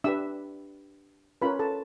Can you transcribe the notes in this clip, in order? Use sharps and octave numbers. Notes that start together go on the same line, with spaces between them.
D4 G4 B4 E5 E6
C#4 F4 A#4 B4 C#5 B5
A4 A5